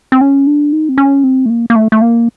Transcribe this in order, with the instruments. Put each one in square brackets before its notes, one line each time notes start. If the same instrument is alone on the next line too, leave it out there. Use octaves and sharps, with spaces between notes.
[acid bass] C4
C#4
D4
D#4
C4
C#4
C4
A3
A#3
A#3
A3
A3
A#3